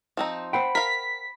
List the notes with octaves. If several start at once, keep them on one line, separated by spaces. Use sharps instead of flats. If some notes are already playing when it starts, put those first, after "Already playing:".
F3 C4 D#4
C5 F#5 G5 B5
A#4 F5 B6